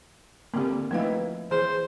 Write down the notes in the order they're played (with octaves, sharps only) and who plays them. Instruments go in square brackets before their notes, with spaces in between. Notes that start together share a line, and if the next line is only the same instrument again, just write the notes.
[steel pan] D3 A#3 [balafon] C4 G4
[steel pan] F3 D#4 E4 [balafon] A3 B4 F5
[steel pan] E3 [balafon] G#4 [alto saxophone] C5